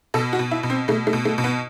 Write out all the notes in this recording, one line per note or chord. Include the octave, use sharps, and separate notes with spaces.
B2 A4
F#4
B2
E4
B2
C4
B2 A3
A3
B2
A3
B2
B3